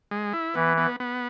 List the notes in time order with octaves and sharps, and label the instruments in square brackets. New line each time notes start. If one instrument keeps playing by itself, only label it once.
[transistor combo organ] G#3
E4
[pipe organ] E3 [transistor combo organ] B3
[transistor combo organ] B3
B3